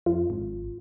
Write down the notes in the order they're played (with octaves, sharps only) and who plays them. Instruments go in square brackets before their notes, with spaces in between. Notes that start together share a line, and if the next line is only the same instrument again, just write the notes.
[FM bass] F2 [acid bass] F4
[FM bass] G#1